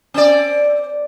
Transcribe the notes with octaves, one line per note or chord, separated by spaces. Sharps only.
C4 D5